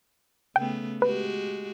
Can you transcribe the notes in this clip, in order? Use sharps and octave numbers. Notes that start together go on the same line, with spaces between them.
C#3 A3 B3 G5
G#3 F#4 G4 B4